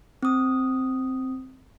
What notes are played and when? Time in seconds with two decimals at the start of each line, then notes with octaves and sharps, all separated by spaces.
0.23 C4 D#6